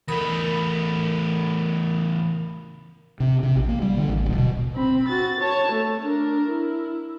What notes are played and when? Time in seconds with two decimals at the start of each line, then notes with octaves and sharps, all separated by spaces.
0.08 E2 A3 A#4 B5 D#6
3.20 C3
3.43 C3
3.56 A#1
3.68 A#3
3.82 G3
3.97 D3
4.08 A1
4.26 D1
4.38 B2
4.75 C4 B5
5.08 F#4 A6
5.41 C#5 A5
5.72 A3
6.04 D4 A#4
6.49 E4